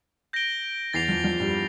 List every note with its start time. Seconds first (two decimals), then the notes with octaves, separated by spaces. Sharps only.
0.33 G6 A#6 D7 G7
0.93 E2 E3 A6 C7 F7
1.09 F2 F3
1.24 F2 F3
1.40 G2 G3